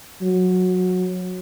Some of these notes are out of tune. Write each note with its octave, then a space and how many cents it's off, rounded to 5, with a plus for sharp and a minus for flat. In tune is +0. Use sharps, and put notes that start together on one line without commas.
F#3 -15